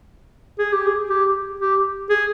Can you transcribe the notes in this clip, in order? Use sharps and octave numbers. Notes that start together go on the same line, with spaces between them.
G#4
G4
G#4
G4
G4
G#4